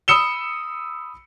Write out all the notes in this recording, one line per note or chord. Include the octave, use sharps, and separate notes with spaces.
B5 D#6 E6 C#7 E7 G7